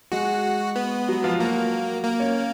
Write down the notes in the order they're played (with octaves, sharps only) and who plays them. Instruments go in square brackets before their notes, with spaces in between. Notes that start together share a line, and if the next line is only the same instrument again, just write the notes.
[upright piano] G#3 G#4 [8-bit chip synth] F#4
[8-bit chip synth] B3
[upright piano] F#3 F#4
F3 F4
[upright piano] F#3 F#4 [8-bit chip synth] A#3
[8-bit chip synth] A#3
[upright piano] C#4 C#5